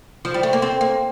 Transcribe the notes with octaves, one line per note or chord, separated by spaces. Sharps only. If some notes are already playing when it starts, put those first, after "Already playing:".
F3
G3
A3
A#3
C4
A#3